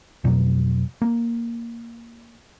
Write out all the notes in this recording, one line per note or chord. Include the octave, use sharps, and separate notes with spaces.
F2 B2 F#3
A#3